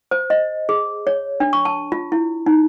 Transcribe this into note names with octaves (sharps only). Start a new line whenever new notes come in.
C5
D#5
G#4
C#5
D4
C#6
A5
F4
E4
D#4